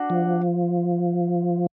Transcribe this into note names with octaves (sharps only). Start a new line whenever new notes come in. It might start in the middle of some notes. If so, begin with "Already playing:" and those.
Already playing: D4 F#4
F3